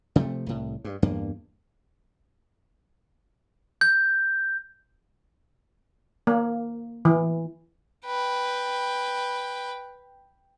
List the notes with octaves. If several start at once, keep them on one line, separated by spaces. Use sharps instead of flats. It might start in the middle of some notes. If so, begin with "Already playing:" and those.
C3 F3 A3
C2 A2
G2
E2 G2 A#3
G6
A#3
E3
B4 G5